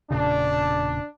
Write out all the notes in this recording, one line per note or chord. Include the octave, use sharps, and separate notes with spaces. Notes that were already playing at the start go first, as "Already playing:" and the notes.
E1 A#2 C#3 D4